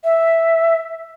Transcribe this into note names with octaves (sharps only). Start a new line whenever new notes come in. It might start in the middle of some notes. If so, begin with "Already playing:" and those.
E5